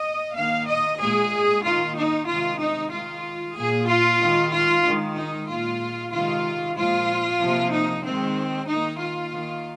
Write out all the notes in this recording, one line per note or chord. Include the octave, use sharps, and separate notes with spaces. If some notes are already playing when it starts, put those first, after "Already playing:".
Already playing: D#5
D#3 A#3 F5
D#5
A#2 G#3 G#4
D#3 A#3 F4
D#4
C3 D#3 G#3 F4
D#4
D#3 G#3 F4
A#2 A#3 G#4
F4
D#3 G#3
F4
D#3 G#3
D#4
A#2 G#3 F4
C3 D#3 G#3 F4
A#2 F3 G#3 F4
C3 F3 A#3
D#4
D#3 G#3 C4
D#3 A#3 D#4
F4
D#3 A#3